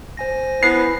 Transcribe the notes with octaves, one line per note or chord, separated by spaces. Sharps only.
C5 G#5 A#6
B3 E4 C7